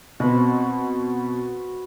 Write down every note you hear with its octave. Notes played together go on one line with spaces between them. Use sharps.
B2 C4 F#4 B4 C5